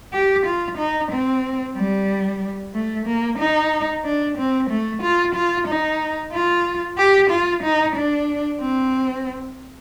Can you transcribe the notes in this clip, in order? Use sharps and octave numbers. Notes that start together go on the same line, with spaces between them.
G4
F4
D#4
C4
G3
A3
A#3
D#4
D4
C4
A3
F4
F4
D#4
F4
G4
F4
D#4
D4
C4